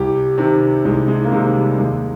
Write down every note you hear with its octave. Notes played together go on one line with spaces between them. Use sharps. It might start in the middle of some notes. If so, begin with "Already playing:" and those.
Already playing: C2 G4
C3 D#3
C2 G#3
G#3
A#3
C3 D#3 G#3
G3
D#2 G#3